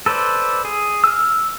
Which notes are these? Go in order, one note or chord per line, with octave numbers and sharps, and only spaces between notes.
A4 B4 C5 D5
G#4
E6 F6